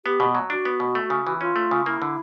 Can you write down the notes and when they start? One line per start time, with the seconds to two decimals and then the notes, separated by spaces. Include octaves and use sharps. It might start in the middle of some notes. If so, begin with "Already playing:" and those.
0.05 B3 G4
0.20 B2
0.35 F#3
0.50 D4 F#4
0.65 B3
0.80 B2
0.95 A3
1.10 C#3
1.27 E3
1.40 C#4 F4
1.56 A3
1.71 C#3
1.86 A#3 E4
2.02 D3